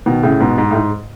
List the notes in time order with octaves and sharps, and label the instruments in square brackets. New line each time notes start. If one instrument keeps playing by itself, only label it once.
[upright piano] B2 D#3
A2 C#3
G#2 B2
G#2
A2
G#2